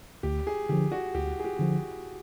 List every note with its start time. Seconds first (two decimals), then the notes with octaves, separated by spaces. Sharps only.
0.23 D2 G4
0.47 G#4
0.69 D3 F3 G4
0.92 F#4
1.14 D2 G4
1.39 G#4
1.44 G4
1.60 D3 F3